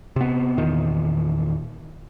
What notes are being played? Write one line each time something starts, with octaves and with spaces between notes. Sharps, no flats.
C3 B3
E2 A#2 D#3